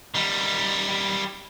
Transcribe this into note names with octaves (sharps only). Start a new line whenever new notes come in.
D#3 G3